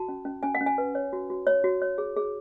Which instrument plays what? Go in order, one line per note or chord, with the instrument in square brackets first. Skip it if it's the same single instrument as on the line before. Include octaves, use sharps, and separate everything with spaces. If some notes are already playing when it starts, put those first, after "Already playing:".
Already playing: [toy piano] F#4 A5
C#4
C#4
C#4 G#5
F#5
C#4
G#5
B4
C#5
F#4
F#4
C#5
F#4
C#5
G#4
G#4